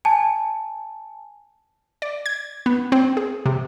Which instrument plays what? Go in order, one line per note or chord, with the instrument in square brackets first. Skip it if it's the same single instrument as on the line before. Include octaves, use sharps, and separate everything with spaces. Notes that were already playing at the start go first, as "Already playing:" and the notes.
[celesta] G#5 A5
[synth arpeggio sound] D5
G#6
B3
C4
G#4
C3